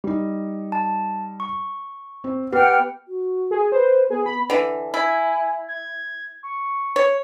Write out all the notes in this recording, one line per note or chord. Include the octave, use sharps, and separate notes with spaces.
G3 D#4
A5
C#6
C4
B3 G4 F#5 G5 F6
F#4
G#4
B4 C5
B3 G#4
B5
D3 E3
E4 G#5
G#6
C#6
C#5